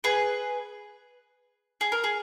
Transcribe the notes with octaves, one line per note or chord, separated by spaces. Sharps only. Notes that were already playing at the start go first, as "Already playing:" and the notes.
G#4 B4
G#4
A#4
G#4